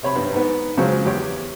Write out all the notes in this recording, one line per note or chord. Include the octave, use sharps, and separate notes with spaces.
C3 C#5 B5
G2 B3
G#2 B3
C#3 F3 F#3 G#3 C#4
E2 G4 C#5